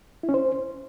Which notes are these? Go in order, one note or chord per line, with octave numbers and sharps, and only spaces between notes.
E4
C#4
C5